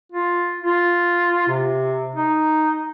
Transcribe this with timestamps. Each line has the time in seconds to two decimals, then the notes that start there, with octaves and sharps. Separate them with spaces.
0.12 F4
0.60 F4
1.48 C3
2.15 D#4